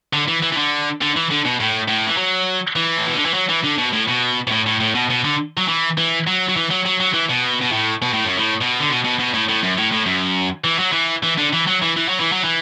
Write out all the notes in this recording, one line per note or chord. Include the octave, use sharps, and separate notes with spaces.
D3
E3
E3
E3
D3
D3
E3
D3
B2
A2
A2
E3
F#3
E3
A2
B2
D3
E3
F#3
E3
D3
B2
A2
B2
B2
A2
A2
A2
B2
B2
D3
F#3
E3
E3
F#3
F#3
E3
F#3
F#3
F#3
E3
B2
B2
A2
B2
A2
F#2
A2
B2
D3
B2
B2
B2
A2
A2
F#2
A2
A2
F#2
E3
F#3
E3
E3
D3
E3
F#3
E3
E3
F#3
E3
F#3
E3